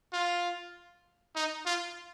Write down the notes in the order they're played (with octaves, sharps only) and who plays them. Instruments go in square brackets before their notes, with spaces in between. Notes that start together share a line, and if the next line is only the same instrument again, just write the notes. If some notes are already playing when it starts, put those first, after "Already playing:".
[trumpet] F4
D#4
F4